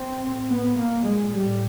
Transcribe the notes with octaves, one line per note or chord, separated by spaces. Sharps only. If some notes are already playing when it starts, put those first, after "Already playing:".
Already playing: C4
A2
B3
A#2 A#3
G#3
A2 G3